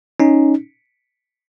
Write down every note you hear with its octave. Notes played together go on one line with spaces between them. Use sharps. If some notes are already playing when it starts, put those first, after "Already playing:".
C#4 D#4